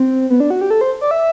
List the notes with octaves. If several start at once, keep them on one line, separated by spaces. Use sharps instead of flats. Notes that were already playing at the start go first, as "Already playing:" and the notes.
Already playing: C4
B3
D4
F#4
G4
A4
C5
D5
E5